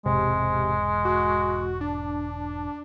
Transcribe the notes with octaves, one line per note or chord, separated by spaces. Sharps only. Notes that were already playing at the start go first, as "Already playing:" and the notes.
E1 G#2 C3 G#3
F#4
D4